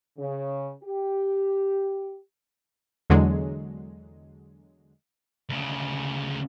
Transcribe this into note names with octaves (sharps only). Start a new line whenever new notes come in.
C#3
G4
E2 D3 F#3 G#3
D2 C#3